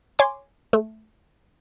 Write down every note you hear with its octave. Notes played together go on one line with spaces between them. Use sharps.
C#5 G#5 C6 D6
A3